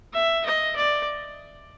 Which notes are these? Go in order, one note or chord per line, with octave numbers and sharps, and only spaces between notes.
E5
D#5
D5